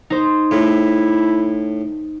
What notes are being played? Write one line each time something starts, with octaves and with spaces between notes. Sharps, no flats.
D#4 C5
A2 E4